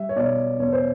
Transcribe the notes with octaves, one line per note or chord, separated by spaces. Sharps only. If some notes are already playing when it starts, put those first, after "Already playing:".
Already playing: G3 E5
C#5
B2 D5
E2 C#5
C5